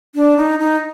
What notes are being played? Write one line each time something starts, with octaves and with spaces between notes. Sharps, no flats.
D4
D#4
D#4